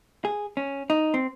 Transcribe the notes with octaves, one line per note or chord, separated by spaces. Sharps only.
G#4
C#4
D#4
C4